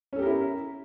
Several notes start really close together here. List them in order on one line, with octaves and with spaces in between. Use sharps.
C#4 A4 G4 A#4 E4